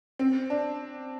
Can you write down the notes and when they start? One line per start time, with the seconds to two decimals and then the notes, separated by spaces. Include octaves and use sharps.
0.19 C4
0.50 D4